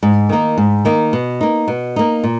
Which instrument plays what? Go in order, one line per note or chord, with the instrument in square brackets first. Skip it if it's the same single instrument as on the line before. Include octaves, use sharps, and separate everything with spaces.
[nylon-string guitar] G#2
D#3 A#3 D#4
G#2
D#3 A#3 D#4
B2
A#3 D#4
B2
A#3 D#4
A#2